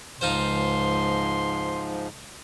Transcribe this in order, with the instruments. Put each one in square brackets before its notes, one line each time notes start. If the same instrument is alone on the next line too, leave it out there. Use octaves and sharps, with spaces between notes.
[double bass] C#2 [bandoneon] G#2 F3 [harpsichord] D#4 F4 C5 [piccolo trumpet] C6